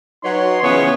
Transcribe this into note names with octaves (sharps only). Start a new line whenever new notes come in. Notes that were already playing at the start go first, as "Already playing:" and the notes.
F#3 D#4 F#4 B4 C#5 C6
C#3 E3 F3 B3 G#4 C#5